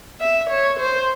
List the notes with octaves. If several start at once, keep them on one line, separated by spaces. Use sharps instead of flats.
E5
C#5
C5